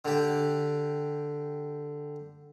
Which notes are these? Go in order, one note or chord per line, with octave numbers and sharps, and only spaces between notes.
D3 G4